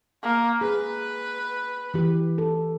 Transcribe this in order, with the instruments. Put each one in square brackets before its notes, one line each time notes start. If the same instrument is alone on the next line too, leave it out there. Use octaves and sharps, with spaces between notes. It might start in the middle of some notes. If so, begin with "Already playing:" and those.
[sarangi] A#3
[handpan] G#4 [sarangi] B4
[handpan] E3 G4
A4